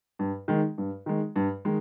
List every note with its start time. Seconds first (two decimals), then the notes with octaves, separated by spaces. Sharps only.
0.19 G2
0.48 D#3 G#3
0.78 G2
1.06 D#3 G#3
1.36 G2
1.65 D#3 G#3